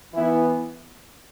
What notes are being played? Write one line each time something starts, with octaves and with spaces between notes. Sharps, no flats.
E3 B3 E4